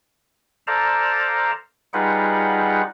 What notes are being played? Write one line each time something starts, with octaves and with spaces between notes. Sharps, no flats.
A4 C5 D5 F5 A5 A#5
G3 D#4 F4 G#4 B4 F#5